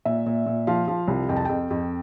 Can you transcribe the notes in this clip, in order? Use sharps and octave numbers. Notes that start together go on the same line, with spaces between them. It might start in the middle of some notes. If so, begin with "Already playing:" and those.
A#2 E5
A#2
A#2
F3 F5
F3
C2
F2 G5
A5
F2 G5
F2